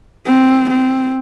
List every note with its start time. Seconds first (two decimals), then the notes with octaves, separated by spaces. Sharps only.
0.27 C4
0.70 C4